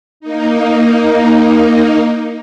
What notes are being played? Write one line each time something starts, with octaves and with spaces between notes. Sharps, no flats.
A#3 D#4